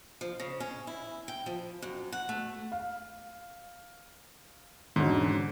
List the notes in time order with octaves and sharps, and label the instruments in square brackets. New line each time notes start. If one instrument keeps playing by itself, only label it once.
[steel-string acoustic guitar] F3
C#3
C#4
E4
G5
F3
F#2
F#5
A3
[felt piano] F5
[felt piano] E1 C#4 F#4 [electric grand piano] G#2 D3